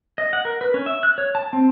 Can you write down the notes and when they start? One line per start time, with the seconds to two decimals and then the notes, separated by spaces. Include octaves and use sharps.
0.18 D#5
0.33 F#5
0.45 A#4
0.61 B4
0.74 C#4
0.86 E5
1.03 F#6
1.18 C#5
1.35 A5
1.53 C4